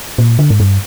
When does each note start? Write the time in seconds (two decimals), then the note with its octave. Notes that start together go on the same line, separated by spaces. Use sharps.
0.18 A#2
0.39 D3
0.50 G#2
0.60 G2